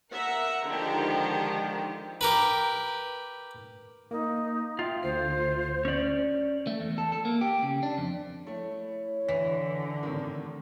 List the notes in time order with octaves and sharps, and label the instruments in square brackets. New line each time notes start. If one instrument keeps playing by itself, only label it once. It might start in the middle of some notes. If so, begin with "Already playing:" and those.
[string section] A#4 E5 F#5 A#5
D3 D#3 F3 G#3 G4
[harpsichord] G4 A#4 B4
[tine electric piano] A#3 [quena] D#4
[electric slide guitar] F4 [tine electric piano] E5 F5 G5
[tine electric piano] D2 D3 C7 [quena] C5
[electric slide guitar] C#4 D5
[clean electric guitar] A3
E2
A4
A4
A#3
G4
C#3
D4
F2
[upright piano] A3 [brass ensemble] E4 C#5
[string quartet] D3 [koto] E3 [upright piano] B6
[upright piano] A2 C3 D#3